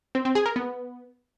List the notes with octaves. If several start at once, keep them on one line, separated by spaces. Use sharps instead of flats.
C4
C4
G#4
A#4
B3